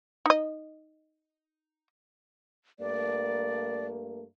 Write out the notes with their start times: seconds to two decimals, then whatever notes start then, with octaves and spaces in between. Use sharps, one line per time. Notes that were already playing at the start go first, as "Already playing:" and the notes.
0.26 D#4 D#5
2.80 G2 A3 A#3 D5